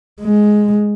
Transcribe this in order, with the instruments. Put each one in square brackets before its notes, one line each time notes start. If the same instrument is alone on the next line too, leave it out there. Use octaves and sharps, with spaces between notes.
[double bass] G#3